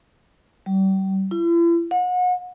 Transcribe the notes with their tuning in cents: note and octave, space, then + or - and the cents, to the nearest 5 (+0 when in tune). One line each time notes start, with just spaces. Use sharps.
G3 -35
E4 +45
F#5 -35